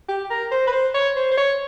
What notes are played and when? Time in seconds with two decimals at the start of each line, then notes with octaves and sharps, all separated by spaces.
0.08 G4
0.30 A#4
0.52 C5
0.68 B4
0.72 C5
0.94 C#5
1.16 C5
1.31 C5
1.37 C#5